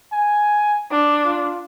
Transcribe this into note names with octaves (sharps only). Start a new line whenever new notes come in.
G#5
D4
F4